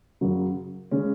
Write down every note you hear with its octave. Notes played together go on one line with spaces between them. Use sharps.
F#2 C#3 F#3
C#3 G#3 C#4